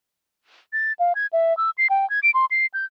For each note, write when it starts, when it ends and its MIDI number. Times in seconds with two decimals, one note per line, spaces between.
0.73 0.93 93
0.99 1.13 77
1.15 1.27 92
1.33 1.56 76
1.57 1.70 88
1.78 1.87 96
1.90 2.08 79
2.10 2.20 92
2.23 2.31 98
2.34 2.45 84
2.51 2.66 96
2.74 2.85 91